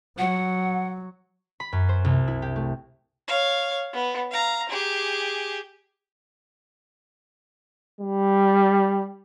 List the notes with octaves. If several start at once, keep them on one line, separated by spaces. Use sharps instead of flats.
F#3 F#5
B5
F#2
C5
C2
E4
G4
A3
C#5 F5
B3
F5 A#5
G4 G#4
G3